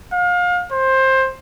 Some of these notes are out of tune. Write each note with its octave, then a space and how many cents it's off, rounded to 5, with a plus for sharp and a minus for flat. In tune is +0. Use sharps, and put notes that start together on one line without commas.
F5 +30
C5 +15